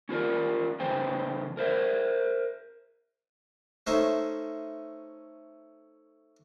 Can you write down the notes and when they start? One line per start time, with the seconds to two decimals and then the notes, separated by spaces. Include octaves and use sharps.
0.09 C#4 F4 A#4 D5
0.80 C#3 E3 C#4 C5 G5
1.57 A#4 C5 E5
3.87 A3 C#4 D#4 C5 E5